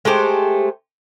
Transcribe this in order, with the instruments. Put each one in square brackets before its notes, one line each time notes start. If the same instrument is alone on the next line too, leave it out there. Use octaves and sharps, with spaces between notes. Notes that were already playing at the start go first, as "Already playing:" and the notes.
[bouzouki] G#3 A3 G4 C5